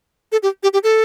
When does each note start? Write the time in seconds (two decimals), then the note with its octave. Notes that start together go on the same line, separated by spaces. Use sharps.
0.32 A4
0.43 G4
0.63 G4
0.73 G4
0.84 A4